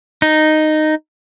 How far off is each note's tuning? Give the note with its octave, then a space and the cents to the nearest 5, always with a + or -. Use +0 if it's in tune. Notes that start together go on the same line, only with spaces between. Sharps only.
D#4 -10